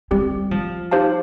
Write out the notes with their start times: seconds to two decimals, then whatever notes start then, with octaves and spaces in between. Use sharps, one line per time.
0.11 G3 C4 G4 D5
0.51 F3
0.91 D#4 G4 C5 F5 A5